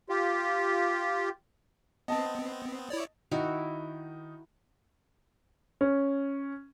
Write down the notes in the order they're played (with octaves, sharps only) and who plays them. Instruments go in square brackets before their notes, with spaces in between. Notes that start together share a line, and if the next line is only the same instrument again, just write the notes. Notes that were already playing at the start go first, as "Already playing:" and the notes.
[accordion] F4 G4
[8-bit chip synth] B3 C4 [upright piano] D#5 A5
[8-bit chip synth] E4 C#5 D5
[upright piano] D#3 D#4 [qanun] E4 F#4 A#4
[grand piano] C#4